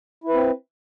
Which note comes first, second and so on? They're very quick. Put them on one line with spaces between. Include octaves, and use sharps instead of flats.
E4 B4 C4